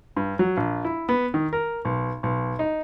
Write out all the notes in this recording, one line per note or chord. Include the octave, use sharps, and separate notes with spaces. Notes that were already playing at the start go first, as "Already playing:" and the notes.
G2
F#3
A#1
E4
B3
D#3
A#4
B1
B1
D#4